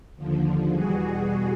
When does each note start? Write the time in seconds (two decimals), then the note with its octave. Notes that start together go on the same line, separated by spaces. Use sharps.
0.17 D#2 D3 F3
0.72 E2 B2 G3 F#4 G#4